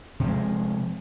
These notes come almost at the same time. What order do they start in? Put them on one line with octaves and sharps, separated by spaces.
C3 F3 G#3